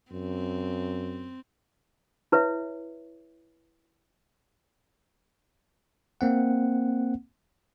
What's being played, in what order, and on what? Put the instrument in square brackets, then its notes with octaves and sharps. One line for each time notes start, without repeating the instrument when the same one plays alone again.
[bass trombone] F#2 [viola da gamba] C4
[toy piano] E4 B4 C#5 E5
[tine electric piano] A#3 C4 F#5